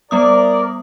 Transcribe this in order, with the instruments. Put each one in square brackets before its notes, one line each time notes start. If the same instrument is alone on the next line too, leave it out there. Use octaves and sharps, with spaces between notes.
[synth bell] G3 B3 D#6 [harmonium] A#4 D5